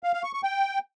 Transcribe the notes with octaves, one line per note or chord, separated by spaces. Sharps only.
F5
F5
C#6
C#6
G5